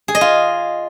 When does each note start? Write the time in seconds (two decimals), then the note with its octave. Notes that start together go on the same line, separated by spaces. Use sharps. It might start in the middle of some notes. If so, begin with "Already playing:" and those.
0.08 G#4
0.15 D#5
0.21 F4